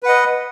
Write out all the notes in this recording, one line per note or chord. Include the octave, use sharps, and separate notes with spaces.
B4 D#5 F#5